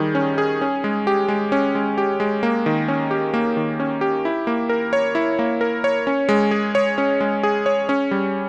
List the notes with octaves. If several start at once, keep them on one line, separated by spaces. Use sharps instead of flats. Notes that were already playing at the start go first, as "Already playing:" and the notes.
Already playing: D#3 G3 G#4
C#4
G#4
C#4
G#3
G4
G#3
C#4
G#3
G4
G#3
A#3
D#3
C#4
G4
A#3
D#3
C#4
G4
E4
A#3
A#4
C#5
E4
A#3
A#4
C#5
C#4
G#3
G#4
C#5
C#4
G#3
G#4
C#5
C#4
G3